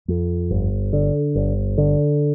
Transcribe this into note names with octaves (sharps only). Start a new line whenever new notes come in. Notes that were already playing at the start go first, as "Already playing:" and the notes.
F2
G1
D3
G1
D3